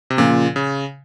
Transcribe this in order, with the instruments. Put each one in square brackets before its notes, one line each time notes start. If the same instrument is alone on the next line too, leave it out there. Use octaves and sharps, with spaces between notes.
[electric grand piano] C3
[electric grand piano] A#2 [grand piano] C#3 F3 A#3 F4
[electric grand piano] C#3